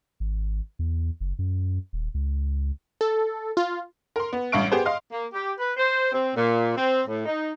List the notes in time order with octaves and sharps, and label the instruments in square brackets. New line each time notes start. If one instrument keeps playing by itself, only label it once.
[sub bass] G#1
E2
F#1
F#2
D#1
C#2
[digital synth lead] A4
F4
[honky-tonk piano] A#4 C6
B3
A1 G2 E5 F5 C#6 D7
B3 G4 G#4 C5
D#5 F5 C6
[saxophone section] A#3
G4
B4
C5
C4
A#2
C4
A2
D#4